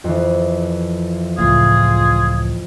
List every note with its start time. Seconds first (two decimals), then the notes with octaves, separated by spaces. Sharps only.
0.04 F2 E3
1.39 C#2 A2 F4 G#4